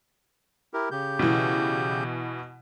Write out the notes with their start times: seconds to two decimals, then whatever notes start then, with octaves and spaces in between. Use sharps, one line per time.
0.74 E4 G4 A#4
0.91 C#3 G4 G6
1.19 B2 E3